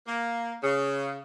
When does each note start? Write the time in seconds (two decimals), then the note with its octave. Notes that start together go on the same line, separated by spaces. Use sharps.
0.06 A#3
0.63 C#3